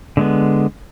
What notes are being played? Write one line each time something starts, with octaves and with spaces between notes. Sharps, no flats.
D3 G#3 B3